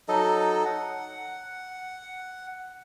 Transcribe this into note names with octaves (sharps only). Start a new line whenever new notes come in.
F#3 D#4 A4 D#5
F#5